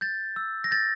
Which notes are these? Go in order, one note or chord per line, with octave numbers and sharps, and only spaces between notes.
G6 A6
E6
A#6
G6 A6